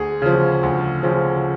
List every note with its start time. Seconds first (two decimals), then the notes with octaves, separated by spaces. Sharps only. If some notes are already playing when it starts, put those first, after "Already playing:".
Already playing: D2 G#4
0.22 C#3 F3
0.63 D2
1.03 C#3 F3